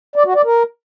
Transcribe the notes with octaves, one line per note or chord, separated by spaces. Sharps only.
D5
F#4
D5
A#4